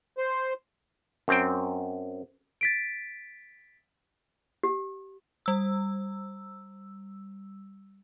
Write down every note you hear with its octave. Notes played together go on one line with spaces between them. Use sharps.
C5
F#2 C4 G5
A6 B6 D7
G4
G3 E6